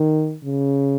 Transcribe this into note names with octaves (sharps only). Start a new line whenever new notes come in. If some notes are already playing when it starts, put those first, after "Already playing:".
Already playing: D#3
C#3